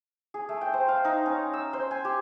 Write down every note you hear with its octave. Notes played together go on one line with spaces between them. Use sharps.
G#4
A3
G5
C5
F5
D#4
C#4
E6
C5
G#5
G4